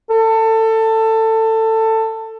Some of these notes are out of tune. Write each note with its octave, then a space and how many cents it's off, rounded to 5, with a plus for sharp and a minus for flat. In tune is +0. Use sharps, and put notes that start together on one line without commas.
A4 +20